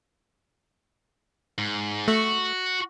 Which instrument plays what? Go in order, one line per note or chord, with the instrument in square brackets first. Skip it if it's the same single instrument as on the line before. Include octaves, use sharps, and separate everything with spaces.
[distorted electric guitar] G#2
[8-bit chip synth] A3 [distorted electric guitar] F#4